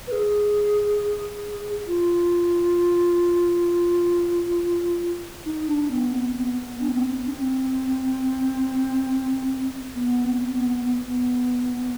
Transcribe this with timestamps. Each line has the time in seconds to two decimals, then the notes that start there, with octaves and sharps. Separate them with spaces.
0.07 B4
0.12 G#4
1.87 F4
5.45 D#4
5.68 D4
5.91 B3
6.13 C4
6.35 B3
6.80 D4
6.89 C4
6.96 B3
7.03 C4
7.26 D4
7.31 C4
9.95 B3
10.25 C4
10.55 B3
10.85 B3